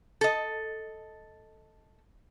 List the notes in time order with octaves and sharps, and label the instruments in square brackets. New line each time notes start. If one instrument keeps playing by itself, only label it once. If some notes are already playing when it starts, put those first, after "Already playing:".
[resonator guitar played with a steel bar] A4 D#5